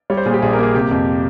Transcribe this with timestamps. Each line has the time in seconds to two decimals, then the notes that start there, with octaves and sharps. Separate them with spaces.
0.10 G3 C#5
0.17 C5
0.26 A#2 G#4
0.34 G4
0.42 A#1 G#4
0.53 A#4
0.59 A#3 G#4
0.75 C3 G4
0.91 F2